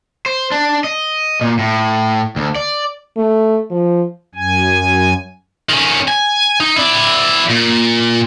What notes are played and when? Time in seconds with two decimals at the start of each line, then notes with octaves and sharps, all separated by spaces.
0.26 C5
0.52 D4
0.84 D#5
1.41 A#2
1.59 A2
2.36 D2
2.56 D5
3.17 A3
3.71 F3
4.35 F#2 G#5
5.69 D#3 C#4
6.08 G#5
6.60 D#4
6.76 E4 D5
7.49 A#2